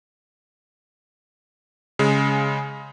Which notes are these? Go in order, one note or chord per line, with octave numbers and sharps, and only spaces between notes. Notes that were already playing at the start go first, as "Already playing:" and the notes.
C#3 G#3